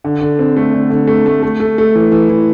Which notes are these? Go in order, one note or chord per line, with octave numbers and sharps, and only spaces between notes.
D3
D3
C4
A3
D3
D3
A3
A3
A3
A3
A3
E3
E3
E3